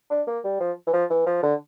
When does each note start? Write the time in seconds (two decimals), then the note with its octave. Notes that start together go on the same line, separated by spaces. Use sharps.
0.10 D4
0.27 A#3
0.44 G3
0.60 F3
0.87 E3
0.93 F3
1.10 E3
1.26 F3
1.43 D3